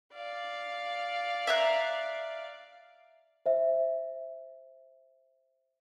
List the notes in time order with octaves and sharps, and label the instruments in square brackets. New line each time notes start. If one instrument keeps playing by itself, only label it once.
[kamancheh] D5 F5
[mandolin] E5 A#5 F#6
[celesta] C5 E5